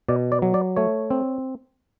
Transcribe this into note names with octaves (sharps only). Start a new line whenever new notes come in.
B2 D5
D5
F#3
D5
A3 C#5
C4